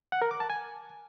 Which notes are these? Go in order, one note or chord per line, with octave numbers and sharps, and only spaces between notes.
F#5
A#4
D6
A5
G#5